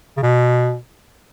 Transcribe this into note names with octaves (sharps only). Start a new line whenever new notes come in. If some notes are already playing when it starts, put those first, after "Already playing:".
C#3
B2